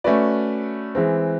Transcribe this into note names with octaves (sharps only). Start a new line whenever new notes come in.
A3 C#4 F#4 B4 D5
E3 G#3 C4